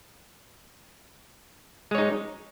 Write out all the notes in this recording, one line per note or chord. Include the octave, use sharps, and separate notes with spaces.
G#3 D#4 C#5